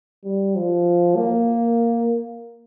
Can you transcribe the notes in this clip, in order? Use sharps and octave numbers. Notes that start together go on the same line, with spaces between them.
G3
F3
A#3